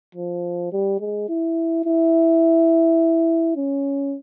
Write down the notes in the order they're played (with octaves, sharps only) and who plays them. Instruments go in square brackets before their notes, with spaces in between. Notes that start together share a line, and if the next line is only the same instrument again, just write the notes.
[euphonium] F3
G3
G#3
E4
E4
C#4